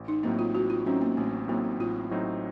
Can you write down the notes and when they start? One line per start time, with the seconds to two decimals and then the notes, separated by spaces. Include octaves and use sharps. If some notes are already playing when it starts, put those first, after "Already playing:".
Already playing: A1
0.08 D#4
0.23 A2 F#3 A#3 C4 D#4
0.39 F4
0.55 A1 F#4
0.70 F4
0.86 A2 F#3 C4 C#4 D#4
1.02 A#3
1.17 A1 A3
1.48 A2 F#3 A#3 C4 D#4
1.79 A1 F4
2.11 A2 F#3 C4 D#4